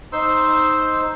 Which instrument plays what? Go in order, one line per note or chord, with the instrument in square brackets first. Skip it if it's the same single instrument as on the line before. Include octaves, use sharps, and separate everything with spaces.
[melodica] D#4 C5 C6 E6